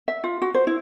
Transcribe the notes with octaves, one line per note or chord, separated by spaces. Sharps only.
E5
F4
F#4
C5
E4